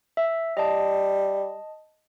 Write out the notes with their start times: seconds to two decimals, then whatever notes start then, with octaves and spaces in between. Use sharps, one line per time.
0.17 E5
0.57 G3 D#5 A5